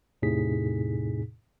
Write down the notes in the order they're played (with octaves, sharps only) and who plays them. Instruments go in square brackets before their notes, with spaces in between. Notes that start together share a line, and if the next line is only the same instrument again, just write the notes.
[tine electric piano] E2 A2 C3 D#4 G#4 B6